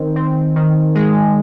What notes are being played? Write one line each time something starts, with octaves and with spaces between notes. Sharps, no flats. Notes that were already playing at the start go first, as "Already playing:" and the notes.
Already playing: D#3 C4
C4
D#3
G#3